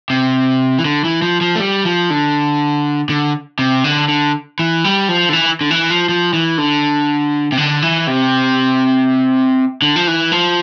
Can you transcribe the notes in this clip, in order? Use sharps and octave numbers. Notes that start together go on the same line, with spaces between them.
C3
E3
D3
E3
F3
F3
A3
G3
F3
D3
D3
C3
D3
D3
E3
G3
F3
D3
E3
D3
E3
F3
F3
E3
D3
C3
D3
E3
C3
D3
F3
E3
F3